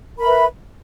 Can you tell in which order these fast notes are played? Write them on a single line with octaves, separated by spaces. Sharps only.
A#4 B5 E5 B4